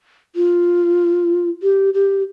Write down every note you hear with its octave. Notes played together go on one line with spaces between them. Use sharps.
F4
G4
G4